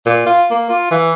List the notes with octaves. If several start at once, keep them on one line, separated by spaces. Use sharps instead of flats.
A#2
F4
A#3
F4
E3